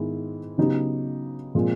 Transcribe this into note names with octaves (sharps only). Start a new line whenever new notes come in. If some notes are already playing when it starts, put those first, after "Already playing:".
Already playing: G#2 D#3 G#3 B3 E4
C#3 F#3 B3 D#4 G4
A#2 F3 G#3 C4